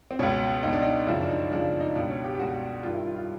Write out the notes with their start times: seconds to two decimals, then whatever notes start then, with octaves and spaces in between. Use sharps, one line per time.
0.11 C4
0.19 C#2 B2 C#4
0.63 C#2 B2 D#4
0.73 D4
0.82 D#4
1.07 F#2 C#3 F3 E4
1.21 D4
1.29 D#4
1.51 F#2 C#3 F3 D4
1.81 D#4
1.95 C#2 B2 D4
2.10 C#4
2.24 G4
2.35 G4
2.39 C#2 B2 F#4
2.83 G2 D#3 F4
2.94 E4
3.06 F4
3.16 F4